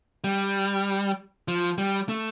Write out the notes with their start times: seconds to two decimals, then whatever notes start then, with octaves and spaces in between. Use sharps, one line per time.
0.24 G3
1.48 F3
1.78 G3
2.09 A3